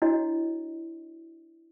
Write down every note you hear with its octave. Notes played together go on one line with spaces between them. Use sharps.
D4 E4 F#4 C#5 D#5